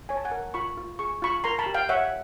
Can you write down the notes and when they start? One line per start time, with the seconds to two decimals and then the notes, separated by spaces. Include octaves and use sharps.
0.09 C#5 G#5
0.17 A5
0.25 F#5 G#5
0.32 A#4
0.54 F4 B5 C#6
0.77 F4
0.99 G#4 C#6
1.22 F4 B5 C#6
1.44 A#4 A#5 C6
1.59 A5 B5
1.66 G4
1.74 F5 G5
1.89 C#5 E5 F#5